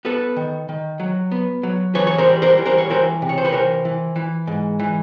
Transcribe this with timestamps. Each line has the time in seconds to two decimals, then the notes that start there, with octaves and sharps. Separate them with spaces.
0.05 B3 A4 B4
0.37 D#3
0.69 D#3
1.00 F#3
1.32 B3
1.63 F#3
1.95 E3 B4 C#5
2.07 C#5
2.18 A#4 C5
2.27 G3
2.42 A#4 C5
2.58 E3
2.66 A#4 C5
2.78 C#5
2.90 E3 A#4 C5
3.22 C3
3.29 C#5
3.38 C5
3.45 B4 C#5
3.52 E3 A#4 C5
3.85 E3
4.16 E3
4.47 G#2
4.80 E3